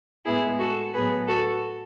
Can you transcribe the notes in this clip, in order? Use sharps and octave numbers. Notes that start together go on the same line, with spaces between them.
A2 G#3 B3 E4 G#4
F#4 A4
A2 F#3 B3 G#4 B4
F#4 A4